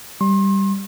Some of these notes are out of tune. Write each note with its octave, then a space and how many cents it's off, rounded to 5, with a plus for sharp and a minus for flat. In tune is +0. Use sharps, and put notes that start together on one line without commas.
G3 +0 C6 +35